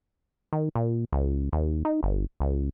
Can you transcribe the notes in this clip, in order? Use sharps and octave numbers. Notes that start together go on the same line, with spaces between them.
D#3
A#2
C#2
D#2
D#4
G1
C#2